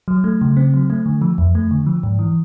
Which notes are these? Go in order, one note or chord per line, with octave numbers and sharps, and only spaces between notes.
F#3
A3
C#3
C4
F#3
A3
D3
F3
F2
A3
D3
F3
G#2
E3